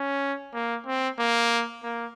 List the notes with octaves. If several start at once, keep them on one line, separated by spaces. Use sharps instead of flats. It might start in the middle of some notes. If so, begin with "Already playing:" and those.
Already playing: C#4
A#3
C4
A#3
A#3